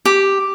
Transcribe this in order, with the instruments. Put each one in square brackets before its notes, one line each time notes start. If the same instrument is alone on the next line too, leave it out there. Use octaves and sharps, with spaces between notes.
[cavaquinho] G4